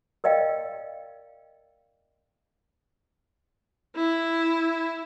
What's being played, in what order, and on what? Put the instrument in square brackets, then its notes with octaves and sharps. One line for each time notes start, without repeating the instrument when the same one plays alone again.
[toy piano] A#4 D5 D#5 F5 G5
[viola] E4